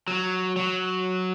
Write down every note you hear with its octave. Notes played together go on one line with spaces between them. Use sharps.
F#3
F#3